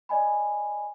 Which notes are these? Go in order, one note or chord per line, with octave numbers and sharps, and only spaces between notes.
D5 D#5 G#5 B5